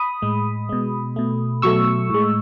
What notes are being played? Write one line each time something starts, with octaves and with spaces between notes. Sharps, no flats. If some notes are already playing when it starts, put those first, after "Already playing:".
Already playing: B5 D#6
A2 G#3
B2 G#3
B2 A3
B2 F#3 A3 C#6 E6
A2 G#3